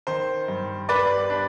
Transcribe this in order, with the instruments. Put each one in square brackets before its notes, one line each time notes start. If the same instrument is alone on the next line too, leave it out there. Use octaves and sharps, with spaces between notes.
[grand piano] D#3 C5
G2
G3 B4 D5
D4